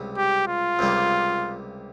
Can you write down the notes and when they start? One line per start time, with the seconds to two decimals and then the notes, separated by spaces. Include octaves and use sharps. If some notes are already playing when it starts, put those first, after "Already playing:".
Already playing: C#2 C3 G3
0.17 G4
0.48 F4
0.79 C#2 C3 G3 A#3